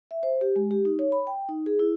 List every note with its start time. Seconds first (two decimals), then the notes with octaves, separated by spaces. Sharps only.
0.11 E5
0.23 C5
0.41 G4
0.56 G#3
0.71 G4
0.85 D#4
0.99 C#5
1.12 B5
1.27 G5
1.49 D#4
1.66 G#4
1.79 E4